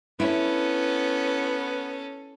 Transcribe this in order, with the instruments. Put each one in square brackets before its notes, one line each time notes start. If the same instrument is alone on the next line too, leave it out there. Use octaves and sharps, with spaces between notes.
[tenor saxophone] B3 [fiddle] C#4 A4 [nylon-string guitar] E4